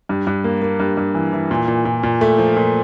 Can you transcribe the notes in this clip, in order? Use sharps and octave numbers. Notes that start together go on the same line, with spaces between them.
G2
G2
A#3
A#3
G2
G2
E3
E3
A#2
A#2
A#2
A#2
A3
F3
A#2